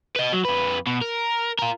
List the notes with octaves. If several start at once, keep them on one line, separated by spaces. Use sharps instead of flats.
B4 D#5
F#3
F2 B4
B2
A#4
F4 A#4